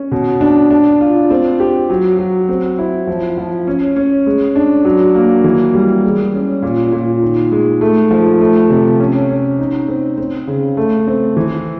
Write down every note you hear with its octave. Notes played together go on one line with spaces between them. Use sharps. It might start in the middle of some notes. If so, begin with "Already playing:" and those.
Already playing: C#4
B2
D4
D4
F4
C4
G4
F#3
F#3
C4
E4
F3
F3
C#4
C#4
G#3
D4
F#3
A#3
E3
G3
G#3
C#4
A#2
A#2
D#3
G#3
A3
F3
A3
C3
C#4
C#4
D#4
C4
C4
C#3
A3
C4
E3